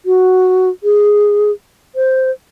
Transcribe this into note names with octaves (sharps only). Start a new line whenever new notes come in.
F#4
G#4
C5